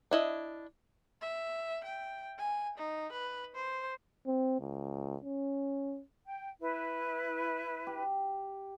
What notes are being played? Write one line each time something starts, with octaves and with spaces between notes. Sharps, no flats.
D4 E4 D#5
E5
G5
G#5
D#4
B4
C5
C4
C#2
C#4
G5
E4 B4
G4